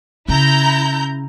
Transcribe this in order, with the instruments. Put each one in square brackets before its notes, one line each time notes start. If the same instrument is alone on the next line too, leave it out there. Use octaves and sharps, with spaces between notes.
[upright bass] C#3 [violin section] E4 A#5 G6